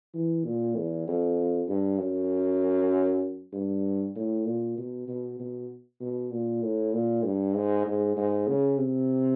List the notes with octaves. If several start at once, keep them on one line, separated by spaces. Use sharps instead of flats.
E3
A#2
E2
F2
G2
F#2
G2
A2
A#2
B2
B2
B2
B2
A#2
A2
A#2
G2
G#2
G#2
G#2
C#3
C3